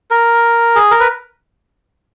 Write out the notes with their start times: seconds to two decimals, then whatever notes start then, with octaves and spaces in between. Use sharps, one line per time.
0.11 A#4
0.76 G#4
0.91 A#4
1.00 B4